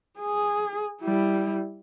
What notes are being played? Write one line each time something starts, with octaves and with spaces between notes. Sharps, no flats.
G#4
G3 E4